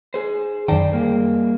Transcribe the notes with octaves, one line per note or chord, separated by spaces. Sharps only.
G#4 C5
F#2 D3 D#3 C5 D5 G5
G3 A#3 G#4